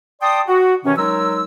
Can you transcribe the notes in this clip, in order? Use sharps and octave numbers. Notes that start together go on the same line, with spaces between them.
D5 G5 A5 C6 D#6
F#4
C3 D#3 E3 C#4
F#3 G#3 D#4 A#4 E6